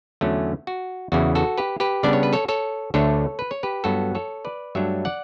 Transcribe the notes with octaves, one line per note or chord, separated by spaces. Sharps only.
E2 D3 F#3 A3 C#4
F#4
E2 C#3 E3 F#4
F#4 A4
G4 B4
G4 B4
C#3 G3 B3 D4 D5
C#5
B4
A4 C#5
A4 C#5
D2 D3 A3 D4 A4 C#5
B4
C#5
G4 B4
G2 F#3 B3 F#4 A4
A4 C#5
B4 D5
G2 F#3 A3 D4 C#5 E5
D5 F#5